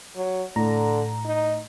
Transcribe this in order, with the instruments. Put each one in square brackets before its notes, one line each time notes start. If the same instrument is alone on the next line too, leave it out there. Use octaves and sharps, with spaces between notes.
[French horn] F#3
[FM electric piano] A2 A#5 [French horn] D3
[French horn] D#4